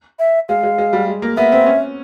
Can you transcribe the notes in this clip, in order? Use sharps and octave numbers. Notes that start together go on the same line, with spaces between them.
E5
G#3 F5
G#3
G#3
G3
G#3
A#3
B3 E5
C4
C#4